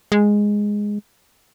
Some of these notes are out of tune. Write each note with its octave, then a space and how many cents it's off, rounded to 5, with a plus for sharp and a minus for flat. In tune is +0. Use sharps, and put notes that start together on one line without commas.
G#3 -5